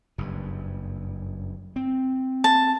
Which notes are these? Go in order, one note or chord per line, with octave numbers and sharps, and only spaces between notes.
F#1 G2
C4
A5